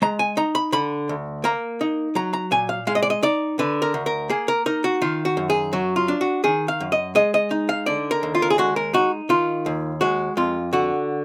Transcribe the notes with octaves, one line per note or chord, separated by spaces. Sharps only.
G#3 A#5
G#5
D#4 A#5
B5
D3 B5
D2
A#3 A#5
D#4
F#3 A#5
A#5
A#2 G#5
F5
G#3 F5
D#5
D5
D#5
D#4 D5
D3 B4
A#4
D2
A#4
A#3 G#4
A#4
D#4 A#4
F#4
D#3 F4
F#4
F#2
G#4
F#3 F#4
F4
D4
F#4
D#3 G#4
F5
F#2
D#5
G#3 D#5
D#5
D#4
F5
D3 D5
A#4
D#2
F4
A#4
G#4
G#3 F#4
A#4
D#4 F#4
D#3 F4
D#2
G#3 F#4
F2 F4
D3 F#4